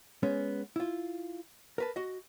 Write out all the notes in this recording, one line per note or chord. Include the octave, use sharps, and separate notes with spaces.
G#3 B3 C#4
E4 F4
A#4 B4 A5
F#4 D#5